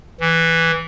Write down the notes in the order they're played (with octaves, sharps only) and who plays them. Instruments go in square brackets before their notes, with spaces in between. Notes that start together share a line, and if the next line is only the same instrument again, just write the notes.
[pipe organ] E3